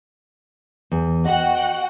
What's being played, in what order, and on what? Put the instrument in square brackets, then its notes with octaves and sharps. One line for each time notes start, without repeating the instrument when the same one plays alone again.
[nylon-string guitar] E2
[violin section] F#4 F#5 G5 [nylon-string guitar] D#5